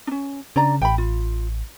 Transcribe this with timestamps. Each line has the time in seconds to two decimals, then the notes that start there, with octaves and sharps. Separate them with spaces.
0.07 C#4 D4
0.56 C#3 D4 D5 A#5
0.82 A1 G5 B5
0.98 F4